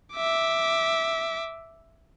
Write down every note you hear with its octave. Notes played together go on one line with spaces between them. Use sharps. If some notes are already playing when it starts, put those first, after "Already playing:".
E5 D6